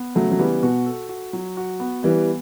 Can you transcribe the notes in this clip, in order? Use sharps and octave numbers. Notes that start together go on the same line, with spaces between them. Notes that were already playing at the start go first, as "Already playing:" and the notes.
Already playing: B3
C#3 F#3 A3
F#3
E3 G3 B3
B2 F#4
A4
F#4
F#3
F#4
B3
E3 G3 B3